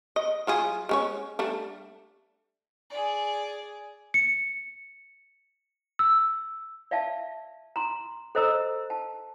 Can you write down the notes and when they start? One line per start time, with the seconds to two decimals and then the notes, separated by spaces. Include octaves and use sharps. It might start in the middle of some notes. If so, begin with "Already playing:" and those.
0.16 D#5
0.47 F#3 F4 G#4
0.89 G#3 C#4 C#5
1.39 G3 A3 D4
2.90 G#4 D5
4.14 C#7
5.99 E6
6.91 D5 E5 F5 A5
7.76 A#5 C6
8.35 A4 C5 D#5 A#5 E6
8.90 A5